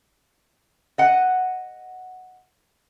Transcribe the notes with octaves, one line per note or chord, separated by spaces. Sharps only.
D#5 F#5